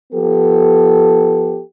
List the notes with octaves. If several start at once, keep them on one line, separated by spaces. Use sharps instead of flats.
F3 B3 G4 A4